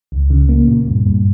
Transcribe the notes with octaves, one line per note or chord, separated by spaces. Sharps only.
C#2
C#3
A#3
A#2
G2
G2